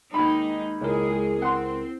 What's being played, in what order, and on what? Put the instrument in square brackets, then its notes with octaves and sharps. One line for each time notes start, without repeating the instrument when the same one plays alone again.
[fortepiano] D#2 B5 [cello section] G#3 D#4
[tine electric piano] C#2 A#4 [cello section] G#3 G#4 [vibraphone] E4
[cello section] C4 [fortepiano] F#5 C6